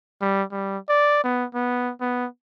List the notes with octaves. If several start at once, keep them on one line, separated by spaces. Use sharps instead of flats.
G3
G3
D5
B3
B3
B3